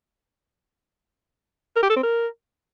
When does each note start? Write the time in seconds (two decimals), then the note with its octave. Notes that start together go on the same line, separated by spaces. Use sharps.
1.76 A#4
1.83 G4
1.90 A4
1.96 C4
2.03 A#4